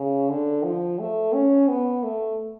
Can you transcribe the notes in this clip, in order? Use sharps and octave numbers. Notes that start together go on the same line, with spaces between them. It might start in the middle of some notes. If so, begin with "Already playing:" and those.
Already playing: C#3
D3
F3
A3
C#4
B3
A3